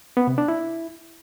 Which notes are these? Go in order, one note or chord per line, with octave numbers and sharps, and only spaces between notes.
B3
C3
D4
E4